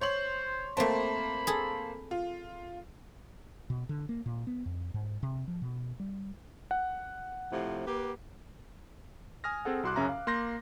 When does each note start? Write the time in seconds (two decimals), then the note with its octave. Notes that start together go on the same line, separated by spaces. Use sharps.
0.01 C5 C#5 C6 F#7
0.77 A3 A#3 C4 C5 A5 B5
1.47 G#4 A4
2.11 F4
3.70 B2
3.89 D3
4.09 A#3
4.26 A#2
4.47 B3
4.66 F2
4.94 G#2
5.23 C3
5.48 F3
5.62 B2
6.00 G3
6.71 F#5
7.51 A2 C3 F3
7.86 A#3 G4 B4
9.44 G#5 D#6 F6 A#6
9.65 C4 G#4 A4 F#5
9.83 C2 F#4 C6 D6 F#6
9.96 F#2 C#3 C#4 E5 A#5
10.09 F5
10.27 A#3 C6 G6 A#6